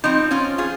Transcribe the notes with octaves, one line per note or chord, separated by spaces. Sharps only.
F3 C4 D#4
C#4 F4
F4 G#4